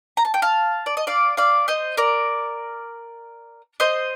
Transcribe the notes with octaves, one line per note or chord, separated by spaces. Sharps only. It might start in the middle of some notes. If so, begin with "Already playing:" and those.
A#5
A5
G5
F5 A5
D5
D#5
D5 F5
D5 F5
C5 D#5
A#4 D5
C5 D#5